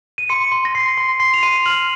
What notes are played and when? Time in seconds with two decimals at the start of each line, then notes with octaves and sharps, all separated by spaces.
0.18 D#7
0.29 C6 C#7
0.52 C6
0.65 A#6
0.75 C6 C7
0.97 C6
1.20 C6 C7
1.34 F7
1.43 C6 D#7
1.66 F6 F#7